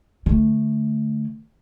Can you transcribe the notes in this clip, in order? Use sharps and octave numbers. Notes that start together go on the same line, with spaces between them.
D3 A3